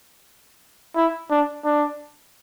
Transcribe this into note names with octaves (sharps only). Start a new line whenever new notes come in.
E4
D4
D4